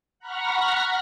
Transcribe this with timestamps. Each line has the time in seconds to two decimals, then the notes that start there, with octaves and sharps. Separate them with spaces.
0.19 F#5 A#5 B5 C#6 F6 A#6